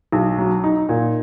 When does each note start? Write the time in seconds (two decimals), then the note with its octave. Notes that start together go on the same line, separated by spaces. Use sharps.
0.12 B1
0.38 F#3
0.64 D#4
0.89 A#2